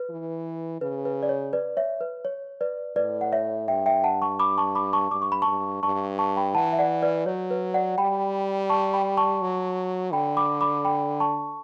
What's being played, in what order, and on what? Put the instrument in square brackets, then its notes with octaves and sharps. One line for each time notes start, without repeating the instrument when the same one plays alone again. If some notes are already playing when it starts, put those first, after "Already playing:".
Already playing: [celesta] B4
[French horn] E3
[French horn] C#3 [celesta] B4
[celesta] B4
D5
C#5
B4 D5
C#5 E5
B4
C#5
B4 D5
[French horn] A2 [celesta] B4 D5
[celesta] F#5
C#5 E5
[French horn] G2 [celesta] E5 G5
[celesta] E5 G5
F#5 A5
A5 C#6
B5 D6
A5 C#6
B5 D6
A5 C#6
[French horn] G2 [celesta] D6
[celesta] C#6
B5
A5 C#6
[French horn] G2
[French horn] G2 [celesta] A5 C#6
[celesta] A5 C#6
G5 B5
[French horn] E3 [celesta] F#5 A5
[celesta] E5
D5 F#5
B4 D5
[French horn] F#3 [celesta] C#5
[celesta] B4
D5 F#5
[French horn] G3 [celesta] G5 B5
[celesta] A5 C#6
G5 B5
A5 C#6
[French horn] F#3
[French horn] D3 [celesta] G5 B5
[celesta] B5 D6
B5 D6
G5 B5
A5 C#6